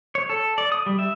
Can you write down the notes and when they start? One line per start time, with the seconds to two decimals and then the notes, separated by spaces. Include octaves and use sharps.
0.15 C#5
0.30 A4
0.58 D5
0.72 D#6
0.86 G3
0.99 E5